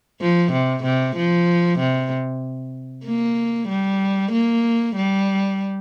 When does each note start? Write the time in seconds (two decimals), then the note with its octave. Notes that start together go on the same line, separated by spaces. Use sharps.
0.21 F3
0.52 C3
0.84 C3
1.16 F3
1.79 C3
3.05 A#3
3.69 G3
4.32 A#3
4.96 G3